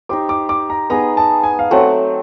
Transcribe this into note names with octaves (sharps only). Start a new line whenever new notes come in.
D#4 G4 C5 D6
D6
D6
A#5
B3 D#4 G#4 A#5
A5
G#5
F5
F#3 A3 C4 F#5